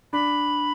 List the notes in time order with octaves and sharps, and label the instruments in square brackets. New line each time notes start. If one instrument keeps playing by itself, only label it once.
[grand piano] D4 [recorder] B5